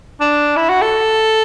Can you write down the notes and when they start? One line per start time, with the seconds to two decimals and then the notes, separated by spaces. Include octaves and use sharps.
0.21 D4
0.57 E4
0.69 F#4
0.82 A4